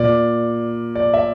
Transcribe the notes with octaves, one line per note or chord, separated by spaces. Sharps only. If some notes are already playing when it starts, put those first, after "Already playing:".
Already playing: A#2 D5
D5
E5